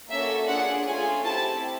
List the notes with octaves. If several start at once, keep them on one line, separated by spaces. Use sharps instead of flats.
A#3 C#4 F#4 A4 E5
D4 F4 G#4 F#5
A3 C#4 F4 G#4 G#5
C4 E4 G4 A5